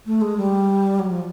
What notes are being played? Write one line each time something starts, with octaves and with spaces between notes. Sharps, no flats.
A3
G#3
G3
F#3
F3